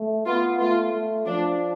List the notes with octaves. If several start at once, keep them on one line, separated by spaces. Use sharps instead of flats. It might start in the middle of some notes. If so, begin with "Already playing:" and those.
Already playing: A3
B3 F4
A3 F4
A3
F3 D4